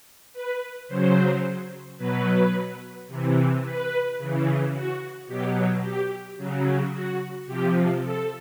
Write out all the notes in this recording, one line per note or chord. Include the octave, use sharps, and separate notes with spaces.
B4
C#3 F#3 C5
B2 F#3 B4
C3 E3
B4
C#3 E3
F#4
B2 F#3 G4
G4
C#3 F#3
F#4
C3 F3 G4
A4